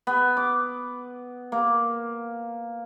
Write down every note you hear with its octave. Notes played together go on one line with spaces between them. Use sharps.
B3
D6
A#3